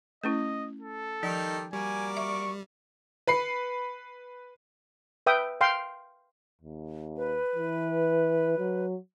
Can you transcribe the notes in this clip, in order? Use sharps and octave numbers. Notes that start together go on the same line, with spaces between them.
A3 C#4 E4 D#5
A4
D#3 F3 G3 D#4 G5
G3 A#3 F#4 D5 G#5
E5 C#6
B4 B5 C7 C#7
B4 E5 G5 D#6
F5 G5 C6
D#2
B4
E3
F#3